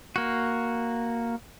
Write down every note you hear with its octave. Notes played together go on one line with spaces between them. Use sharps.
A#3 F#4